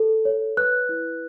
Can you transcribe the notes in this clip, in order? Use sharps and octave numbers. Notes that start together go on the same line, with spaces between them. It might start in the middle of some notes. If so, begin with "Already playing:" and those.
Already playing: A4
C#5
B4 F#6
E4